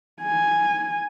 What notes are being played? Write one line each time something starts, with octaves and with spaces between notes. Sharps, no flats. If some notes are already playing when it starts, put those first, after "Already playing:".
G#5